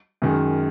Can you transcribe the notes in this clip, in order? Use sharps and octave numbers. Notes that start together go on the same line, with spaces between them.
F#2 D#3 G#3